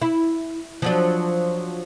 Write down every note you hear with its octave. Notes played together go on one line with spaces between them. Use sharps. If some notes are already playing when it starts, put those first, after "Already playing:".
E4
F3 F#3 D4